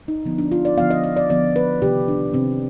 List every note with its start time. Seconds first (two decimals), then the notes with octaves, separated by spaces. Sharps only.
0.08 D#4
0.25 D3 F3 B3
0.38 D4
0.52 F4
0.65 D5
0.78 D3 F3 B3 F5
0.91 D#5
1.04 D#5
1.17 D5
1.30 D3 F3 B3 D5
1.56 B4
1.82 C3 D#3 B3 G4
2.08 D4
2.34 C3 D#3 B3 C4